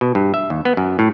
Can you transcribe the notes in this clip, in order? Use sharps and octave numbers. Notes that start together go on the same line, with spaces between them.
B2
G2
E5
D#2
B3
F#2
A2